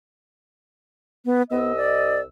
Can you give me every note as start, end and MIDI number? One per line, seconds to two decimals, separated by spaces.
1.25 1.42 59
1.51 2.23 36
1.51 1.72 59
1.51 2.23 75
1.51 2.23 88
1.77 2.21 74